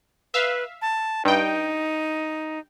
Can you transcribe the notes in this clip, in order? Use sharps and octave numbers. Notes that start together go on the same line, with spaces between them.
B4 E5 F5
A5
G2 D#4 G5